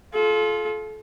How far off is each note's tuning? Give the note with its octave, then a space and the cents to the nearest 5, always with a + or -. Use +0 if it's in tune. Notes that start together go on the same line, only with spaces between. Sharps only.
F4 +0 A4 -35